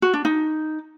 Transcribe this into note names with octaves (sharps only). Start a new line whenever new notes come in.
F#4
D4
D#4